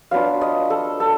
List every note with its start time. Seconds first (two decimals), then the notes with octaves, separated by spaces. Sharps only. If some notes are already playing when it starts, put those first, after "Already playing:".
0.11 F#3 B3 D4 F4 F5
0.41 D#5
0.70 A4
1.00 A4